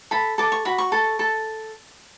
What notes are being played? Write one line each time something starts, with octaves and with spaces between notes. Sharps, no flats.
A4 B5
A4 D6
C#6
F#4 B5
C#6
A4
A4